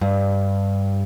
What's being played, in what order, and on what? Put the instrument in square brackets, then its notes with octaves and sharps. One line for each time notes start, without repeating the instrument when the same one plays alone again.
[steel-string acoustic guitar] G2